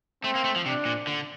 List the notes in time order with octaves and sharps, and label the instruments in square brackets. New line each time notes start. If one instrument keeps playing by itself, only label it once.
[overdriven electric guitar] A3 [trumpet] C4
[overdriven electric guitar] A#3
A3
F3
[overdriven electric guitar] C3 [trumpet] D4
[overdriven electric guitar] A#2
D3